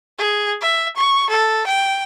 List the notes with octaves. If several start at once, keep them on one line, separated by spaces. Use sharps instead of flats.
G#4
E5
C#6
A4
G5